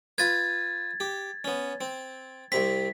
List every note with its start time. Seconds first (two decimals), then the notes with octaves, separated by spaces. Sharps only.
0.18 F4 B4 G#6 A6
1.00 G4
1.44 B3 C#4
1.81 C4
2.52 C2 C3 C4 B6